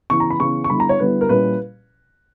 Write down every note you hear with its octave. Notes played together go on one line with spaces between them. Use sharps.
C#3 E3 B3 C#6
A#5
B5
C#3 E3 B3 C#6
C#6
D3 G3 B3 E4 B5
A#5
C#5
D3 G3 B3 E4 B4
A#4
A#2 G3 C#4 E4 B4